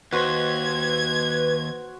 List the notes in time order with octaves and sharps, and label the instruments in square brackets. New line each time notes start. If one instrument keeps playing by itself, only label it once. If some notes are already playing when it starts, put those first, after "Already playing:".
[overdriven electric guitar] D#2 [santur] F#4 C5 [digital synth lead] B4 [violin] G#6